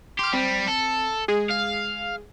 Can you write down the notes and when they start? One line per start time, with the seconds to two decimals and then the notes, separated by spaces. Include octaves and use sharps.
0.19 G4 C6 F6
0.33 G3 C4
0.68 A4
1.28 G#3 G#4
1.50 F5